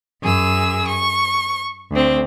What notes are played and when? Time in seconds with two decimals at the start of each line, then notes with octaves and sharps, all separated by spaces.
0.22 F#2 G#4 E6
0.87 C#6
1.91 D2 C4